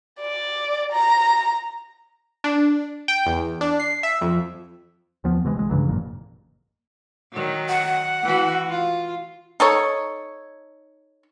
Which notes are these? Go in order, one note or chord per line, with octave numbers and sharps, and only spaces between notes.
D5
A#5
D4
G5
E2
D4
C7
E5
F2
D#2 F3 B3
C3 E3 G#3
B1 G#3
G2 C#3 E3 F#3
G1 F2 A#2
D#3 F#3
F#5
E3 F#4
F4
D#4 A4 C#5